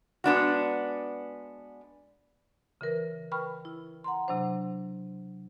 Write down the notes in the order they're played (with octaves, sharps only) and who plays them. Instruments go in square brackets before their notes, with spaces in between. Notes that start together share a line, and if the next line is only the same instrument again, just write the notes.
[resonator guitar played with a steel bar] G#3 B3 D4 F#4
[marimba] C#3 E3 A#4 B4
A#4 B4 G5 B5 C#6 F6
E4
F#5 A#5 C6
C3 F#3 D4 C5